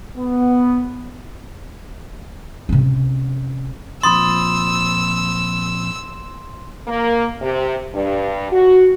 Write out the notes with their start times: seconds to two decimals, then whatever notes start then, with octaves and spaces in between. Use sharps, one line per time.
0.17 B3
2.69 C3 C#4
4.03 A#2 F3 C4 B5 C6 D#6 E6 A6
6.88 A#3
7.42 C3
7.94 G2
8.51 F#4